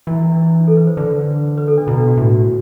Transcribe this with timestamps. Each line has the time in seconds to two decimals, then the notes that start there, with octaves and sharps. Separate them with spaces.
0.07 E3 E4
0.22 E4
0.32 D4
0.42 E4
0.67 A4
0.77 B4
0.87 C5
0.97 D3 B4
1.58 B4
1.68 A4
1.77 D4
1.87 B2 E4
1.97 D4
2.07 F#4
2.17 A2 F#4